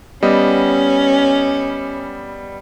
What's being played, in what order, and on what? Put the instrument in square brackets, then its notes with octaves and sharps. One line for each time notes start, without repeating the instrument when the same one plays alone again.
[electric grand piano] G3 B3 D#5 [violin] C#4